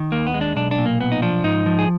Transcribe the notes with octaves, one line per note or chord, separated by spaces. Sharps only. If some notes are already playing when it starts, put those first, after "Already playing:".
Already playing: D#3
D#2 A#3
B3
G#3
D4
B1 D4
D4
A#2
A#3
B1 B3
D#4
F3 D4
G#2 D#4
F3
G#4